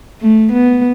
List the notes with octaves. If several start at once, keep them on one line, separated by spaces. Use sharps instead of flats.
A3
B3